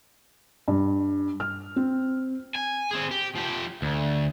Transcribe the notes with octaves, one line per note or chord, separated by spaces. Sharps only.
G2
F6
C4
G#5
C4 G#4
G4
F3 G4
D2